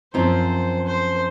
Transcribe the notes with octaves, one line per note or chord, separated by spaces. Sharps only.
F#2 F3 C4 F4 C5
C5